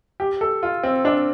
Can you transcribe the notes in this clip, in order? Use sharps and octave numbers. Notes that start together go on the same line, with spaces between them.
G4
A4
F4
C4
D4